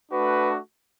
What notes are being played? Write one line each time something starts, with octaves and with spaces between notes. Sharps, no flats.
A3 D4 F#4 B4